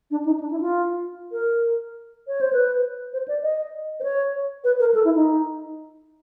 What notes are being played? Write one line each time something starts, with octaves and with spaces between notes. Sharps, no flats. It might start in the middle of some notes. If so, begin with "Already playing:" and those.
D4
D#4
D4
E4
F4
A#4
C#5
C5
B4
C5
D5
D#5
C5
C#5
B4
A#4
A4
E4
D#4